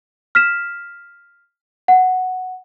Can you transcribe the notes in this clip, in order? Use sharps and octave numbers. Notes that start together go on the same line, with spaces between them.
F6 B6 E7
F#5